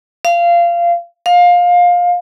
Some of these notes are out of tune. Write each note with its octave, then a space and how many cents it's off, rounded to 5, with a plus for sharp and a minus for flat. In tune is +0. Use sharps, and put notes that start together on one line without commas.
F5 -20
F5 +20